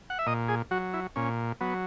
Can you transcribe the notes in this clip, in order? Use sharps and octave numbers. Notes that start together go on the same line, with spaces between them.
F#5
E5
A#2 D#5
G#4
F#3 F#4
E4
A#2 C#4
F#3 B3